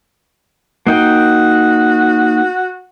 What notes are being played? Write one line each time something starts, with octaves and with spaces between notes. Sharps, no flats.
A#3 D#4 F#4 G5